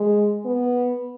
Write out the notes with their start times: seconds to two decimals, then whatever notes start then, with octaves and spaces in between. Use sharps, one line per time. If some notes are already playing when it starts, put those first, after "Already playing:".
Already playing: G#3
0.45 B3